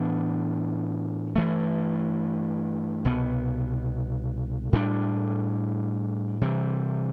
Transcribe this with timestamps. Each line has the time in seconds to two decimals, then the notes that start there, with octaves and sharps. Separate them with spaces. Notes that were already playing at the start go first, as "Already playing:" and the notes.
Already playing: A2 E3 B3 D4
1.36 G2 E3 A3
3.05 C2 B2 B3
4.73 A2 G3 B3 D4
6.41 C3 E3 G3